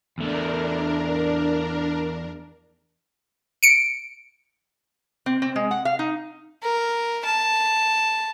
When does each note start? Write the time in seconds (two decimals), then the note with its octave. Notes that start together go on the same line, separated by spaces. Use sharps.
0.18 E2 A3 D4 A#4
3.63 C#7 D7
5.26 C4
5.42 C4
5.56 G#3
5.71 F#5
5.85 F5
5.99 D#4
6.62 A#4
7.25 A5